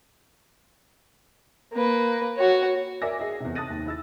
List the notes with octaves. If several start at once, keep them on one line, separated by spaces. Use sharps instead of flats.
A#3 B4
F#4 C#5
A#4 D5 E5 G#5 D6 A#6
G#4 D#5 E5
E2 C3
A5 D#6 F#6 A6 A#6 D#7
D#2
E4 E6 A6